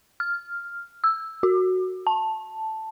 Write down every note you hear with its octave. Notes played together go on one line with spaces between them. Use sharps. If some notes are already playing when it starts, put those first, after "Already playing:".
F6
E6
F#4
A5